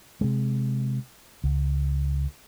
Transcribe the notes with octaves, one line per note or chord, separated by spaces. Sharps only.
C3 G#3
C#2